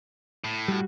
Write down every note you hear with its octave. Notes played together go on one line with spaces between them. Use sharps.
A2
G3 F#4